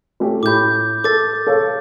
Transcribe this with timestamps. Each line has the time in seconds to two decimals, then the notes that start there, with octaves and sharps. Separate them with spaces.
0.20 A3 C#4 G4
0.43 A2 B5 D6 G6
1.04 A4 D6 A6
1.47 A4 C#5 F5